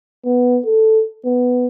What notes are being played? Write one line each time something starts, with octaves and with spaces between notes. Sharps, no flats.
B3
A4
B3